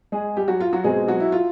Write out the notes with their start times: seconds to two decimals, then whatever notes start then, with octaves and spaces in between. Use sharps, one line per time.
0.12 G#3 G#4
0.37 G3 G4
0.48 F#3 F#4
0.61 F4
0.73 F#3 F#4
0.84 B2 G#3 C4 G#4
1.08 F#3 F#4
1.20 E4
1.32 F4